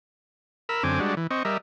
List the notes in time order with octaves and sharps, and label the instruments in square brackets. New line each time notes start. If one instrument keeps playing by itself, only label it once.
[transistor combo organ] A#4 B5 E6
F#2 D3 C4 G#5 D6
G3 G#3 D4 F#4
E3
C4 D#5 C#6
G3 A#4 D#5 E5